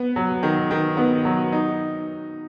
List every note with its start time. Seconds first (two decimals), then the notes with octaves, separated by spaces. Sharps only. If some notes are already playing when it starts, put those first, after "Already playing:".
Already playing: B3
0.16 F#3
0.43 D#3
0.71 D#3
0.97 B3
1.25 F#3
1.52 D#4